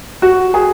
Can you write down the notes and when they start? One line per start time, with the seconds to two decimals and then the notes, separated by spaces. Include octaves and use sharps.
0.22 F#4
0.54 G#4